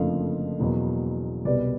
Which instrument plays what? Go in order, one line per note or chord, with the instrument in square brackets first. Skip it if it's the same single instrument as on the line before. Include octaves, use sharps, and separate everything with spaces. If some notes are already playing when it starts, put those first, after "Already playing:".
Already playing: [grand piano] F#1 F2 D3 F3 A3 F5
E2 B2 F#3 A#3
C2 B2 G3 B3 D5